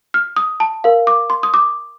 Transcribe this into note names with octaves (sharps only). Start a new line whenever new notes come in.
F6
D#6
A5
A#4 F5
D6
C6
D#6
D6